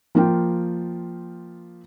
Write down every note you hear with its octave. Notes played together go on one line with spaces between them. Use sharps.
F3 A#3 F4 G5